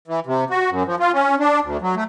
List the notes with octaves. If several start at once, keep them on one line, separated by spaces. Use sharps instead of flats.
E3
C3
F#4
F#2
F3
F4
C#4
D4
D2
F#3
A3